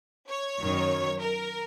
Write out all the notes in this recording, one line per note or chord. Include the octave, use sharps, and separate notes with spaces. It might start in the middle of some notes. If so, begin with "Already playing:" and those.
C#5
F#2 D#3 F#3
A#4